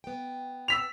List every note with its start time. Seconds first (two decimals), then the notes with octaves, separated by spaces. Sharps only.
0.04 B3 G5
0.68 E6 B6 F7